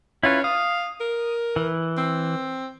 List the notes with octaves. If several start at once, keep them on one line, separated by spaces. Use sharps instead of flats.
C#4 E4 F4 B4
F5 D#6
A#4
E3
C4